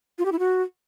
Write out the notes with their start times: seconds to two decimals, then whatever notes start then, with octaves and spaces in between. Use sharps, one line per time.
0.18 F4
0.25 G4
0.32 E4
0.39 F#4